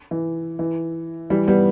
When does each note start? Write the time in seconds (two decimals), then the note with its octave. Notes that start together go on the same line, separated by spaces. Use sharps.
0.11 E3
0.59 E3
1.30 E3 G3
1.48 G3 B3